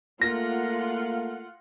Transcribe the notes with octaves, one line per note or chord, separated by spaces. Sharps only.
A3 A#3 F4 F#5 A#6